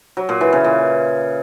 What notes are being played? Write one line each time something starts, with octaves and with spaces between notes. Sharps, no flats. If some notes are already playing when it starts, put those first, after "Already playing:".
F#3
A#2
E3
C#3
A#2